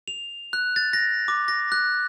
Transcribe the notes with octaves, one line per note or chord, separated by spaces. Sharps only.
F7
F#6
A6
A#6
D6
A#6
F#6